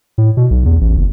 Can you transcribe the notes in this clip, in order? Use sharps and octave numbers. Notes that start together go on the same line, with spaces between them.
A2
B2
B1
E2
A1
F#1